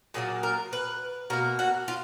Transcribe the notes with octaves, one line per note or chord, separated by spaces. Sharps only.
A#2 F#3 A#3 G#4
A#4
B4
B2 A#3 A#4
F#4
F4